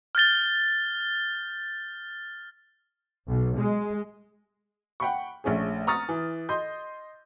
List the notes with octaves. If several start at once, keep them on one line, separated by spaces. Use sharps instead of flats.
F6 G6 A6 G7
B1
G#3
F#5 G5 B5 C#6
A#1 A3 C#4 G#4
A#5 C#6 D#6 F6 A6
E3
D#5 C6 G6